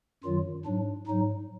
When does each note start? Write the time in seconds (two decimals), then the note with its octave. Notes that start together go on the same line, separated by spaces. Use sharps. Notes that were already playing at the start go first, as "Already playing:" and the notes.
0.24 F#2 D#3 F#3 F4
0.65 G#2 F#3 D4
1.07 G#2 F#3 D#4